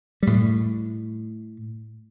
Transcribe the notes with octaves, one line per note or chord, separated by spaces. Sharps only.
A2 G3